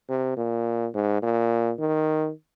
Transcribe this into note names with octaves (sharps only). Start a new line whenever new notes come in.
C3
A#2
G#2
A#2
D#3